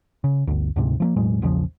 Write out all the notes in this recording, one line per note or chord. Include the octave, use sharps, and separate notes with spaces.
C#3
G1 D2
D2 G#2 C3
F3 A3 A#3
E1 A2 F#3 G#3
A#1 E2 C#3 F3